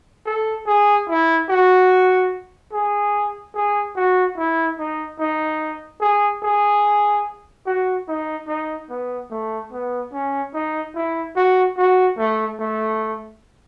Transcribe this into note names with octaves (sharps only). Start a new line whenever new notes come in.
A4
G#4
E4
F#4
G#4
G#4
F#4
E4
D#4
D#4
G#4
G#4
F#4
D#4
D#4
B3
A3
B3
C#4
D#4
E4
F#4
F#4
A3
A3